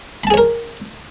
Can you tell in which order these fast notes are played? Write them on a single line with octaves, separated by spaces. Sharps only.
B5 A5 G#4 C#5 A#4